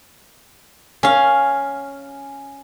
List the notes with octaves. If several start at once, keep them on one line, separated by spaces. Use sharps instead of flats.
C#4 F5